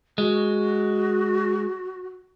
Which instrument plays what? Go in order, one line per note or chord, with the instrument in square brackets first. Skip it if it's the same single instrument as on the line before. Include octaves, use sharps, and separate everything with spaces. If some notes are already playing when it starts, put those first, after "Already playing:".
[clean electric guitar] G#3 [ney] F#4